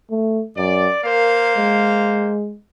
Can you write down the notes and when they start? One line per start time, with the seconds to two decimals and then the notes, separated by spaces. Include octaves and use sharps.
0.11 A3
0.57 F#2 D5
1.04 A#3 A#4 C5 F5
1.56 G#3